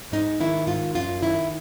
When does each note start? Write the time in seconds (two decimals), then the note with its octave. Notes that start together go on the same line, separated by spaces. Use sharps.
0.12 G#2 D#4
0.40 D#3 E4
0.67 G#2 F4
0.95 F#2 F4
1.23 D#3 E4